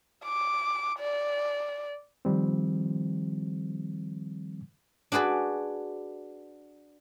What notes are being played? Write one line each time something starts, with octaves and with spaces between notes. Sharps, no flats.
D6
D5
D#3 F3 G3 C4
D4 F#4 G#4 B4 D5